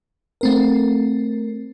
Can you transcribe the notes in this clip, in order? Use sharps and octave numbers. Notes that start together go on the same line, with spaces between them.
A3 C4 A#4